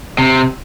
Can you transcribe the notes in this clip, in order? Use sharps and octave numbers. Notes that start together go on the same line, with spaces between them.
C3